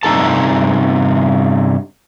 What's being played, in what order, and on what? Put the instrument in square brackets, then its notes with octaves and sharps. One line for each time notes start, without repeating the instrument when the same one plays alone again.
[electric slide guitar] G2 C3 D#4 A4 A5